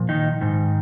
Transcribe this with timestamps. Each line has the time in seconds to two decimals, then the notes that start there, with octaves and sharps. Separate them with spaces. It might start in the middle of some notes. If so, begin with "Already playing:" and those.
Already playing: A#2 F3
0.09 D#3 D#4
0.41 G#2 D#3